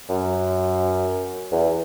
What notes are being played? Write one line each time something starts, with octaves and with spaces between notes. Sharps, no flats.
F#2
E2